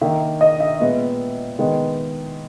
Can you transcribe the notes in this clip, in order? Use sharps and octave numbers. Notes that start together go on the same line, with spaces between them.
D#3 A#3 E5
D#5
E5
A#2 G#3 B3
D#3 G#3 B3